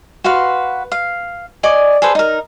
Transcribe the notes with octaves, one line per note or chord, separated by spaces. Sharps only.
F#4 B4 F5 C6
F5
D5 D#5 G#5 C#6
G#4 A4 B4 C5
D#4 A#4